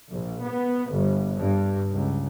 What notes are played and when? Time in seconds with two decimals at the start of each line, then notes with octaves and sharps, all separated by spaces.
0.11 A#1
0.42 B3
0.91 G1
1.39 G2
1.92 C#2